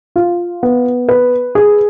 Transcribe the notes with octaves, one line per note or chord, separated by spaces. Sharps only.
F4
B3
B4
G#4